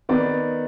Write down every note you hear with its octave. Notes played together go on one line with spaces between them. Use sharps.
D#3 B3 D5